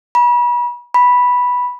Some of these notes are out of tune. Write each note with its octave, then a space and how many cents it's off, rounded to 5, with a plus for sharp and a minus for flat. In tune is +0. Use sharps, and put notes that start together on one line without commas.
B5 -35
B5 -5